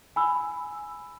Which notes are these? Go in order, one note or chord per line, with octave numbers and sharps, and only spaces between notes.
G#5 B5 E6